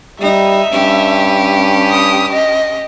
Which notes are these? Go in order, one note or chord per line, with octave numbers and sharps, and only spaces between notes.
G3 D#4 E5
G2 C#4 G4
D#6
D#5